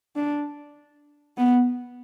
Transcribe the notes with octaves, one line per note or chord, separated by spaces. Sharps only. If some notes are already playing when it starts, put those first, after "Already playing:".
D4
B3